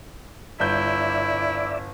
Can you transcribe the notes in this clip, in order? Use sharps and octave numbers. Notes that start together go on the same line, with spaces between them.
G1 E4 D5 E5 G6